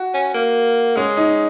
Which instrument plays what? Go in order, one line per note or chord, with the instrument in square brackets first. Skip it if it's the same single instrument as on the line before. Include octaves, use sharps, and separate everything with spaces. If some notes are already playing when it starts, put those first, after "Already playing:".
Already playing: [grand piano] F#4
[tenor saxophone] C#4
A#3
[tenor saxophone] G#3 [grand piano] C#4
[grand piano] D#4